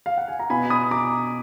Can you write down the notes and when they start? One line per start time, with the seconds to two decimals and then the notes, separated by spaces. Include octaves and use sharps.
0.06 F5
0.18 F#5
0.28 G#5
0.40 A#5
0.50 B2 G#5 B5
0.70 B5 D#6
0.91 A#5 D6